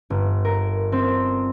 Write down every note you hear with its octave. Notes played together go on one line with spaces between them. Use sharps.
G1
A#4
C4